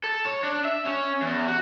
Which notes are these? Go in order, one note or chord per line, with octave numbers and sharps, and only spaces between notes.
A4
C#5
D4
E5
C#4
E2
F#4